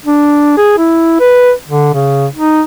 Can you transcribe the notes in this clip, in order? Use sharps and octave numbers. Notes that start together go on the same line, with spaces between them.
D4
G#4
E4
B4
D3
C#3
D#4